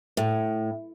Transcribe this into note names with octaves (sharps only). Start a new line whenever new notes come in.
A2